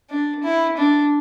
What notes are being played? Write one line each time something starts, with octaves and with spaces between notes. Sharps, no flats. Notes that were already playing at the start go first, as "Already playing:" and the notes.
D4
E4
D4